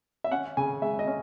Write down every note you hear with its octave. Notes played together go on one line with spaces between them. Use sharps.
E5
C#4 F#5
C#3 G#5
G#3 E5
D#5
C#4